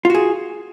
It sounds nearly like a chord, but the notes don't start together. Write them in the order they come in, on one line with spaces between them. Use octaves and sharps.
F4 F#4 G#4